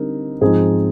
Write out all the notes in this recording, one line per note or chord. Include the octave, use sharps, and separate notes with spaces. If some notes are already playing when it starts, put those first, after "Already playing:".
Already playing: D3 G3 C4 D#4 A#4
G#2 F3 C4 D#4 G#4